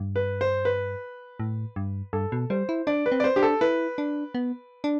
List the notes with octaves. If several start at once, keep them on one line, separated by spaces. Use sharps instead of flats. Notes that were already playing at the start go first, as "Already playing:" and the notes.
Already playing: G2
B4
C5
B4
A2
G2
G2 A4
B2
G3 C5
E4
D4 D5
B4
C4
D5
C5
D4 G4
A4
E4 B4
D4
B3
D4